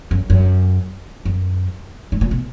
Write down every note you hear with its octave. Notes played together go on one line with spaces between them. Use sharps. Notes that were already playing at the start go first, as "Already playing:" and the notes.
F#2
F#2
F#2
G#2
A#2
B2